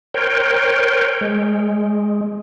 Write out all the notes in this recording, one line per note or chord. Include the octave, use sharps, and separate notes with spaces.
A#4 C5 C#5 G5
G#3